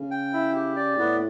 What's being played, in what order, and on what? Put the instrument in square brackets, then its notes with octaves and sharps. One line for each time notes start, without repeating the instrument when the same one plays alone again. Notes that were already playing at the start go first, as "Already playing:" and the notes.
Already playing: [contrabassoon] C#3
[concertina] G5
E4
G4
D5
[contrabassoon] A2 [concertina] B3